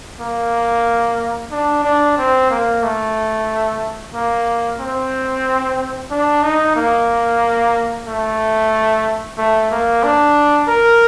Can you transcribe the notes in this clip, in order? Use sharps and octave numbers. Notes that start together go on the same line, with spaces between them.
A#3
D4
D4
C4
A#3
A3
A#3
C4
D4
D#4
A#3
A3
A3
A#3
D4
A#4